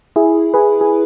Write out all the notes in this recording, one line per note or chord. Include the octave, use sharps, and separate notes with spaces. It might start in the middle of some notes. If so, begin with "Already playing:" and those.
E4 G#4
G#4 B4
G#4